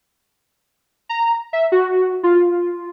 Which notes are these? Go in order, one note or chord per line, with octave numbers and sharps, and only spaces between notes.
A#5
E5
F#4
F4